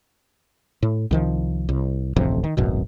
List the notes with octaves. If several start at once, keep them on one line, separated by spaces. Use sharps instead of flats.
A2
C2 D#3 F3
C2
D1 A1 F2 C3
D#3
D1 G#1 F#2 B2